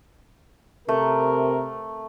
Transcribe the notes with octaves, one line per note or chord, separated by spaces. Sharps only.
C3 A3 A#4